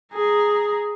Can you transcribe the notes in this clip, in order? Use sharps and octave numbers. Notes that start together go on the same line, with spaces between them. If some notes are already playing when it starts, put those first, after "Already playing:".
G#4 A#5